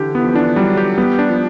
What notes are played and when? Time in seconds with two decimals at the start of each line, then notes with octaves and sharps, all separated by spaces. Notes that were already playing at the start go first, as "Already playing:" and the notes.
Already playing: D3 E3 G4
0.15 E3 B3
0.24 F3
0.34 E3 D4
0.56 F#3 G3
0.77 G4
0.98 G3 B3
1.19 D4
1.30 F3